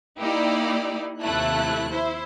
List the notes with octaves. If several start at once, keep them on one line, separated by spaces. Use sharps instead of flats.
A#3 D#4 E4 G4 D5
D#2 C3 F3 A3 E4 F#6
E4 C5